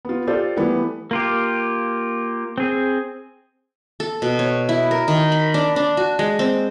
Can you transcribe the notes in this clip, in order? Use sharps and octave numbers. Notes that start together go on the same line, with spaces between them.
B3 F4
F4 G4 A4 C5 D5
E3 G3 A3 B3
A#3 F4 G4
C4 G#4
A4
B2
C#5
E4
A#4
D#3
B5
D4
D4
F#4
G#3
C4